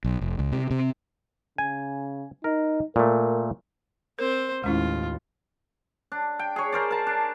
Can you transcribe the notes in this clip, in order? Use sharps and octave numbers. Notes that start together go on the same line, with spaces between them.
B1
F1
C#2
C3
C3
C#3 G#5
D#4 A#4
A#2 A3 A#4
C4 A#4 C5
D#2 A2 G#3 C#4 E4 F4
D4
G5
G#4 C#5
G#4 A#4 C5 D5
A#4 A5
D4